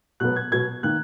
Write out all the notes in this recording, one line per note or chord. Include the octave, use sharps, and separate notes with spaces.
B2 F#3 B3 F#6
G#6
B2 F#3 B3 G#6
D#3 A#3 F#6